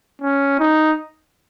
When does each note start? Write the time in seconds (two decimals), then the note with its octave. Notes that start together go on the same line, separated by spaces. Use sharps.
0.22 C#4
0.59 D#4